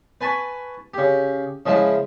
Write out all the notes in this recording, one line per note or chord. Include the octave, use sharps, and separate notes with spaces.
B4 G#5 A5 B5 C#6
C#3 G4
C#3 F3 G#3 E4